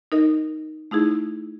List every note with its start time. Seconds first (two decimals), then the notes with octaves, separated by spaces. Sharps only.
0.12 D#4 A#4 D#5
0.91 A3 D#4 E4 G#4